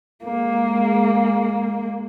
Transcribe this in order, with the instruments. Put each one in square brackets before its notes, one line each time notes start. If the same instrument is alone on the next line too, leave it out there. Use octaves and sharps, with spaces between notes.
[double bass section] G#3 [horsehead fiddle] A#3